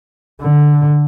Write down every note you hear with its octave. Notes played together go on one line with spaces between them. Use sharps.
D3